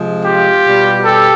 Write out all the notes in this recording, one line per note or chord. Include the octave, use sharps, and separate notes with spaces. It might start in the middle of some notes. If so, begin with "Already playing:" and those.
Already playing: C3 F3 G#3
F4 G4
B2 G3
G4 A4